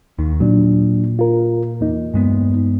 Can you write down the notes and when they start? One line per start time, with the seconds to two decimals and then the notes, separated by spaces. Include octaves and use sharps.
0.19 D#2 D#3
0.40 A#2 F#3 D4
1.19 F4 A#4
1.81 E2 A#3 D#4
2.14 G2 G#3 B3